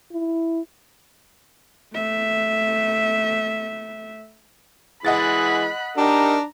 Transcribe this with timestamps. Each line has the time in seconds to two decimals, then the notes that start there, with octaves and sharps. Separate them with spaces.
0.12 E4
1.94 A3 E5
5.05 E3 G#3 D#5 F#5 B5 F#6 A6
5.97 D4 D#4 G4 A#4 A#5